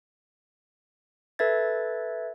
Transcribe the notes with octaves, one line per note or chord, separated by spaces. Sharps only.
A4 B4 E5 G#6 A6